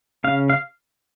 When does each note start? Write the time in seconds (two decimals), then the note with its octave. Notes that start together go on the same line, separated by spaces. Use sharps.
0.24 C#3 F5
0.50 F5